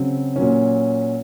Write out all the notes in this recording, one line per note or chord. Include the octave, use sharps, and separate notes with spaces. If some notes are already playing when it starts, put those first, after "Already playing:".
Already playing: C#3 F#3 C4
A#2 F#3 C#4